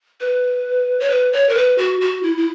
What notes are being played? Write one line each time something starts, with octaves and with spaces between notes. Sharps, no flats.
B4
C#5
B4
C#5
A#4
B4
F#4
F#4
E4
E4